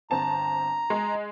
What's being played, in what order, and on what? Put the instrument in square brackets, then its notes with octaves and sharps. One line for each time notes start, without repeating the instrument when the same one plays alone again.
[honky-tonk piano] G1 C4 A5 [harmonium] A#5
[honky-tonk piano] G#3